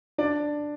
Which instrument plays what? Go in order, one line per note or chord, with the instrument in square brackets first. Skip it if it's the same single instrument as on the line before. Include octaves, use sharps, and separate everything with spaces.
[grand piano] D4 D5